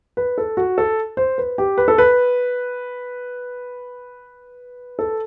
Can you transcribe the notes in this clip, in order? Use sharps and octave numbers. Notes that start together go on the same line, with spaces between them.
B4
A4
F#4
A4
C5
B4
G4
B4
A4
B4
A4